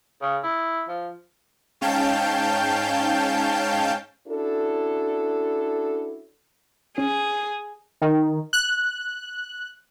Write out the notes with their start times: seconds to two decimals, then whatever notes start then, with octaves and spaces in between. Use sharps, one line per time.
0.22 C#3
0.44 E4
0.88 F3
1.81 G#2 C#4 F5 G5 A5 G6
4.27 C#4 D4 E4 F#4 A4
6.98 C#4 G#4
8.02 D#3
8.53 F#6